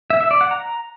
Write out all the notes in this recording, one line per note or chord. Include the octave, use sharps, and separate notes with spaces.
E5
E5
D5
F#5
A#5